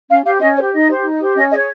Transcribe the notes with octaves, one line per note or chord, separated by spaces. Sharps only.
C#4 F5
G4 C5 F5
C#4 D#5
G4 C5 C#5
D#4 D#5
G4 C5
D#4
G4 C5
C#4 D#5
G#4 C#5 D#5